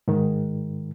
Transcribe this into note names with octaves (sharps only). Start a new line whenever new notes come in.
G#2 D#3